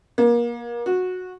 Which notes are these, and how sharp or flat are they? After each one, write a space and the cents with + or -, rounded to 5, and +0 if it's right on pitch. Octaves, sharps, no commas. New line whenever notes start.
A#3 +30
F#4 -15